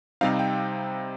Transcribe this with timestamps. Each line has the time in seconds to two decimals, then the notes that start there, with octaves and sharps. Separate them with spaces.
0.21 C3 G3 C4 D#4 F5
0.39 G5